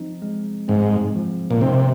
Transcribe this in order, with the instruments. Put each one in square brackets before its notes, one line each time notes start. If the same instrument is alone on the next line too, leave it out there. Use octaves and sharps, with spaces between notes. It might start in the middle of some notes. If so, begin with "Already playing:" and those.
Already playing: [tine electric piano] F3 C4 D#4
G#3
[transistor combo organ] G#2 [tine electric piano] C4
[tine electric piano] F3
[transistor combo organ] A#2
[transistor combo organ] C3 [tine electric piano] D#4